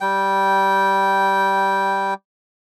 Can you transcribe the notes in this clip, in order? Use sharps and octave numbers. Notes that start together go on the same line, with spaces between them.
G3 G5